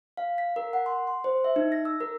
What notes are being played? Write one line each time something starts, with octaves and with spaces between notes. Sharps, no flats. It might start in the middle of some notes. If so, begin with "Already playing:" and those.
F5
B6
A#4
F#5
C6
C6
C5
E5
D#4
A#6
E6
A#4